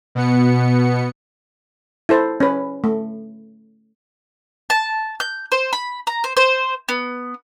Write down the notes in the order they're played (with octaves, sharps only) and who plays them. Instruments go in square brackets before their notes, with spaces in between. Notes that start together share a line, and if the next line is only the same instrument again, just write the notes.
[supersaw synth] B2 B3 C#7
[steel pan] E4 A4 C5 A5
C#4 B4
A3
[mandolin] A5
G6
C5
B5
A#5
C5
C5
B3